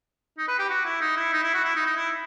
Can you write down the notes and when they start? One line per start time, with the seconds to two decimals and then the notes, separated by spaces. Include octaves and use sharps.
0.38 D#4
0.48 B4
0.59 G4
0.69 F#4
0.85 E4
1.01 D#4
1.17 E4
1.33 D#4
1.43 E4
1.54 F#4
1.65 E4
1.76 D#4
1.86 D#4
1.96 E4